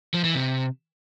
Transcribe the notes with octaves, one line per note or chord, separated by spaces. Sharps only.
F3
E3
C3